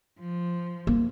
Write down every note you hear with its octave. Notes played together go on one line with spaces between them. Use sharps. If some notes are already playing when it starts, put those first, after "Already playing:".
F3
A#3